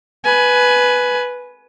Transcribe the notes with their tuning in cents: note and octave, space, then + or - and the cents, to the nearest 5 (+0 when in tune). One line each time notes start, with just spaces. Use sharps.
B4 +0 G#5 +20